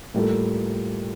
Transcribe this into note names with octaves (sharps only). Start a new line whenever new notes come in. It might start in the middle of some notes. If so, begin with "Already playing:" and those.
A2 G3 A#3 F4 A4